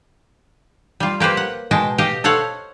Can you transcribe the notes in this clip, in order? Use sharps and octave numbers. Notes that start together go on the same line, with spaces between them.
G3 F4
A#3 G4 B4 C5
F#5
B2 G#3 G5 A5
G4 D#5 F5
A4 C5 C#5 F5 F#5